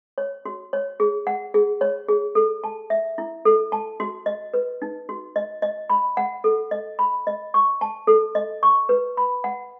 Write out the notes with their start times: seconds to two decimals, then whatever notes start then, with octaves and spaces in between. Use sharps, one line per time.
0.18 C#5
0.45 F#4
0.73 C#5
1.00 G#4
1.27 F#5
1.54 G#4
1.81 C#5
2.08 G#4
2.35 A4
2.64 A5
2.90 E5
3.18 E4
3.45 A4
3.72 A5
4.00 F#4
4.26 D#5
4.54 B4
4.82 D#4
5.09 F#4
5.36 D#5
5.62 D#5
5.90 B5
6.17 F#5
6.44 A4
6.71 D#5
6.99 B5
7.27 D#5
7.54 C#6
7.81 A5
8.07 A4
8.35 D#5
8.63 C#6
8.89 B4
9.17 B5
9.44 F#5